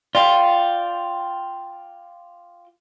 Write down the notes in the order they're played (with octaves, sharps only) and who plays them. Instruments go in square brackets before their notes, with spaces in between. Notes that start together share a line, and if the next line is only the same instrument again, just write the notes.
[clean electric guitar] F4 [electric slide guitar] D5 G5